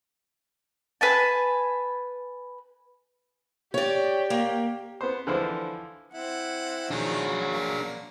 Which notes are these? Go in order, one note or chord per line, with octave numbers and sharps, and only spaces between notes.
B4 G#5 A5
G4 C#5 D5
A#3
B3 C5
D3 E3 F3 E4 C5
C4 E4 F#5
D#3 F3 F#3 D4 G#4
A#3